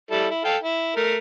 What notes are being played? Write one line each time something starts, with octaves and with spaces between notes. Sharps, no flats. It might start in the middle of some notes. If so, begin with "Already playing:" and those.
G3 E4 A4
E4
A4 F5 G5
E4
A3 A#4